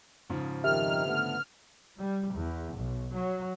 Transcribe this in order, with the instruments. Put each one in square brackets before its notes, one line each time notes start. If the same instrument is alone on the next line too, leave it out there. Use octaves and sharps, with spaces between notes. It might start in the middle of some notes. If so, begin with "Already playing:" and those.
[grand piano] G#2 C#3 F3
[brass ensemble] F2 D#3 [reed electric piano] G4 E5 [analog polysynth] F6
[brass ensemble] D3 A3 B3
[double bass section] G3
E2
B1
F#3